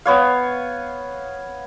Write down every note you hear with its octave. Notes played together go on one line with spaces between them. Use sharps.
B3 C#5 F5